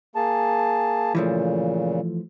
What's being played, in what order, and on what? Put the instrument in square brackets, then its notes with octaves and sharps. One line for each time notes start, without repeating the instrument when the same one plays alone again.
[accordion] A#3 G#4 A5
[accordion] A#2 C#3 [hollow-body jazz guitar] E3 F3 A3